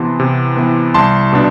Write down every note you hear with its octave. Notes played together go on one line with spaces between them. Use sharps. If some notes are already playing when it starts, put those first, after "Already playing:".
Already playing: C3 E3 B3 A5 C6
C3
E3 B3
C2 A5 C6
B2 B3 D4